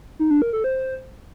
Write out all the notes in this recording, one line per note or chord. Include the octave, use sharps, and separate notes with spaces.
D#4
D4
A#4
A4
C5